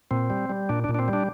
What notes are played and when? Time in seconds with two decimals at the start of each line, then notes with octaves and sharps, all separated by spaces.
0.11 A#2 C4
0.30 G3
0.50 G3
0.69 A#2 D4
0.84 D4
0.89 A#2
0.95 D4
0.99 C4
1.08 G3
1.13 D4